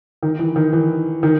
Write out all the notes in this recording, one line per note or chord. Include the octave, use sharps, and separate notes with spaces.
D#3
E3
D#3
E3
D#3